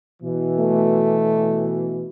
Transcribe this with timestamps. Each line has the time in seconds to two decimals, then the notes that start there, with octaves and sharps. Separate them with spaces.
0.23 B2 E3
0.59 A3